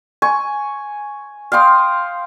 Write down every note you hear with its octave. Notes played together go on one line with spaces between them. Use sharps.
G#5 C#6
F5 G5 C6 D#6